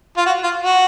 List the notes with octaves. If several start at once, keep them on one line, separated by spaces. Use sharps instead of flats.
F4
F#4
F4
F#4